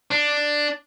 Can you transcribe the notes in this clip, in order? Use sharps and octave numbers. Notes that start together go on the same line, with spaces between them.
D4